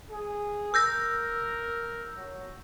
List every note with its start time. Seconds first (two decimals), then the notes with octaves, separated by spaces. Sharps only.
0.10 G#4
0.74 A#4 E6 G6 A#6
2.17 F#3